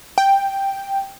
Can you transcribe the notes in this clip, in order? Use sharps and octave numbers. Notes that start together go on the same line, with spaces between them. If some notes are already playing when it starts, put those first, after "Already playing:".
G5